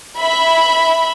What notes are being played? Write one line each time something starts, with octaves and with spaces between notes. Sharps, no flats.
E5 B5